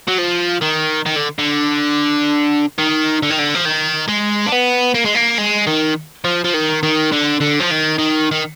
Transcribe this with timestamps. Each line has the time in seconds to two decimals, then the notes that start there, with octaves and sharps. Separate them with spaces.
0.08 F#3
0.19 F3
0.61 D#3
1.06 D#3
1.16 D3
1.39 D3
2.79 D#3
3.22 D3
3.30 D#3
3.39 D3
3.55 F3
3.65 D#3
4.09 G#3
4.47 D4
4.52 B3
4.95 A#3
5.05 G#3
5.15 A#3
5.38 G#3
5.67 D#3
6.25 F3
6.45 F3
6.54 D#3
6.83 D#3
7.12 D3
7.40 D3
7.60 F3
7.70 D#3
7.98 D#3
8.31 D#3